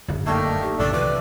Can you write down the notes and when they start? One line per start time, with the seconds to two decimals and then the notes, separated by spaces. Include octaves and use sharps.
0.08 D1 G1 F#2
0.27 D#3 A3 A#3 D4 G5
0.62 G4
0.79 A1 F#2 C#3 A3 D4 D5
0.93 C2 D#3 E3 F4 B4 D5